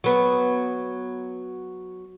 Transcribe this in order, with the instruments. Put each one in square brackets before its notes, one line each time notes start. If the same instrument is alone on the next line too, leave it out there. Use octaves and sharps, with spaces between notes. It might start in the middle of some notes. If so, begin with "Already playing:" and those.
[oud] F#3 B3